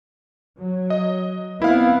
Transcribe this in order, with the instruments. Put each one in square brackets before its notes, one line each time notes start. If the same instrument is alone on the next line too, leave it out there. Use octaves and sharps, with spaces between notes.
[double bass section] F#3
[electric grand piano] D#5
[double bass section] B3 C4 [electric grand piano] E4 F5